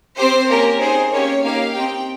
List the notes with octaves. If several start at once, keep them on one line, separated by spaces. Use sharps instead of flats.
C4 G4 C5
A#3 C#4 G4 A#4
C4 D#4 G#4 C5
A#3 C#4 G4 C#5
A#3 D#4 G4 F5
C4 D#4 G4 G5